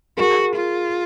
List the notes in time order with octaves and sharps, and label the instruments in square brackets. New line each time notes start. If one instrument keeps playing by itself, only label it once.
[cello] F#4 [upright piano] G#4 A#4
[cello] F4